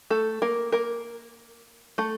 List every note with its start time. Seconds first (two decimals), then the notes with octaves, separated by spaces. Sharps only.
0.10 A3 A4
0.42 A#3 A#4
0.72 A#3 A#4
1.98 A3 A4